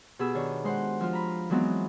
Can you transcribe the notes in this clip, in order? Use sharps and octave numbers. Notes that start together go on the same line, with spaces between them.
B2 G4 G#4 B5 E6
D#3 D4 C#5
G#3 C5 F#5
F3 F4
A#5 B5
E3 F#3 G#3 B3 C4 D#4